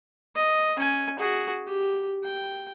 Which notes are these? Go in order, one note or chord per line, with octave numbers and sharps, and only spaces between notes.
D#5
C#4 G#5
F#4 G#4
G4
G5